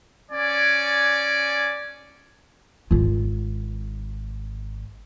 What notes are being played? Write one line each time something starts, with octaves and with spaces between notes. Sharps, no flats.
C#4 D5 G#5
G#1 F4